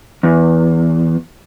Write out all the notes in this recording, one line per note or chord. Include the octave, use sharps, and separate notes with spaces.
E2